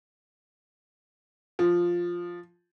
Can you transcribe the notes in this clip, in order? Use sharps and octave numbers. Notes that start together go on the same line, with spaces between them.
F3